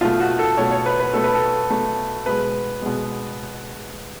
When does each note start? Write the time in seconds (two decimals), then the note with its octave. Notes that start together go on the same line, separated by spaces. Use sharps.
0.01 B2 A3 F4
0.20 F#4
0.39 A4
0.57 B2 A3 C#5
0.71 C#5
0.86 B4
1.00 B4
1.13 B2 A3 A4
1.24 B4
1.34 A4
1.70 B2 A3
2.26 B2 G#3 B4
2.82 B2 G#3